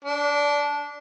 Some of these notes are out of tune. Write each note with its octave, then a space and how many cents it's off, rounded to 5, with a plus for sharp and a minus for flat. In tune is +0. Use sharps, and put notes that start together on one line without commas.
D4 -15